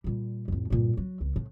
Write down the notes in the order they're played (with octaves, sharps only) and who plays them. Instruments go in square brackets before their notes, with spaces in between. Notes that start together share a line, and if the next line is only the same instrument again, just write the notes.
[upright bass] A#2 G3
A1 F2
G2 A#2
F#3
C#2
A2